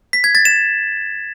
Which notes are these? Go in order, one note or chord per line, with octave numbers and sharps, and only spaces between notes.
B6
G#6
A6
E7